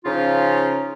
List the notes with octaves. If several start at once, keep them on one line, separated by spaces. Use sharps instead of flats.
C#3 F3 C#4 D#4 F4